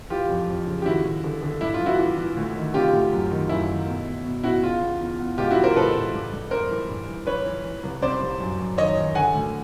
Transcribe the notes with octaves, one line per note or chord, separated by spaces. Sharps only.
E3 F4 G4
F2
F2
C#3
G4
D#2 E4 F#4
D#2
D3
D3
G2 E4
F4
E3
E4 F#4
E3
E3
D2
D#3
C3 F4 G4
D2
F#2
D#3
F#2 E4
D#3
B2
B2
B2
B2 E4 F#4
C#3 F4
E2
E2
E2
C#2 F4 G4
E4 F#4
E3
A#4 C5
C#2 A4 B4
C#2
G2
G2
G2 A#4 C5
E3
G2
E3
E3 B4 C#5
E3
E3
C2
C3 C5 D5
C2
F#2
F#2
D#3 C#5 D#5
D#3
D3 F#5 G#5
D2